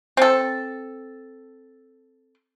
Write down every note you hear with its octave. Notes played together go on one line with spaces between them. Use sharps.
C4 A4